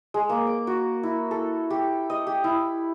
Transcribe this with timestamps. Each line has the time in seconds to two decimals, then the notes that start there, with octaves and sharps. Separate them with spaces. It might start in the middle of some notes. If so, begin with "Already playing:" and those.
0.14 G#3
0.29 A#3
0.47 D6
0.67 F#4
1.03 E4
1.31 A4
1.70 G4
2.10 D#5
2.27 G4
2.44 E4